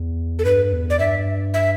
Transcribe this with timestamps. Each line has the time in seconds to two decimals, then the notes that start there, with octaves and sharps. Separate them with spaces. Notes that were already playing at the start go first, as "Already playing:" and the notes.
Already playing: E2
0.39 A4
0.45 G2 B4
0.73 E2
0.90 D5
0.99 G2 E5
1.54 E5